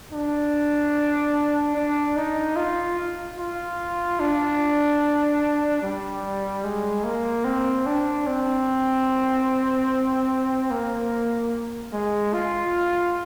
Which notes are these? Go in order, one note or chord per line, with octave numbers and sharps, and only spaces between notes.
D4
D4
D#4
F4
F4
D4
G3
G#3
A#3
C4
D4
C4
A#3
G#3
F4